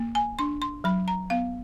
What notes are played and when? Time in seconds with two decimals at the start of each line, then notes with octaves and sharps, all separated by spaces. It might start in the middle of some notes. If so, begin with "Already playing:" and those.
Already playing: A#3
0.15 G#5
0.39 D4 C6
0.62 C6
0.84 F#3 B5
1.08 A#5
1.30 B3 F5